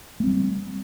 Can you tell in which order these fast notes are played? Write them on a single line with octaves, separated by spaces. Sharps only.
A3 C4 G3